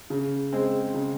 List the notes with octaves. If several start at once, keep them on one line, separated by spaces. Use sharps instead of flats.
C#3
G#3 C4
C#3